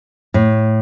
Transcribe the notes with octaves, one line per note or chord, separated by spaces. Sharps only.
A2